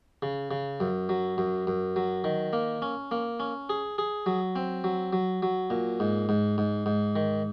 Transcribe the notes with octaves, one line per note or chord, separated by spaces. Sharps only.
C#3
C#3
F#2
F#3
F#2
F#2
F#3
D#3
A#3
C#4
A#3
C#4
G#4
G#4
F#3
C4
F#3
F#3
F#3
A#2
G#2
G#2
G#2
G#2
D#3